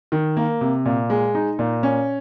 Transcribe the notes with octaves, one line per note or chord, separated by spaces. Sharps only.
D#3
A#3
C3
A#2
G#3
D#4
A#2
C#4